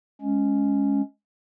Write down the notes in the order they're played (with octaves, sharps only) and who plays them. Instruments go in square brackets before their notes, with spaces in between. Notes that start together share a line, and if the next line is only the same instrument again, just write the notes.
[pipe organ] G#3 C#4